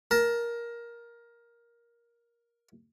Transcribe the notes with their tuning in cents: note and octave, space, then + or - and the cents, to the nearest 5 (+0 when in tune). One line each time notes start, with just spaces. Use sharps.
A#4 +15 A5 +0